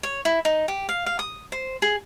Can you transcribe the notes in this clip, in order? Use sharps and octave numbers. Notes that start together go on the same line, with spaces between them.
C#5
E4
D#4
G4
F5
F5
D#6
C5
G#4